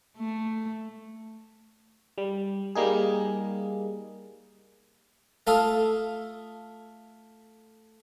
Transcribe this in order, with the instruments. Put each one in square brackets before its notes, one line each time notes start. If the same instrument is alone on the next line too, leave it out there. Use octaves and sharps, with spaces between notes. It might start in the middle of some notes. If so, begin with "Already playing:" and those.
[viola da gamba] A3
[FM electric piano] G3
G3 A#3 D#4 G#4
[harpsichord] A3 F4 A4 F5 D#6